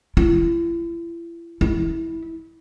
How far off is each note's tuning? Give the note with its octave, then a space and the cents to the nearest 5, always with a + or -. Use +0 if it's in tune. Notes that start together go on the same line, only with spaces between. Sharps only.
E4 +40
E4 -10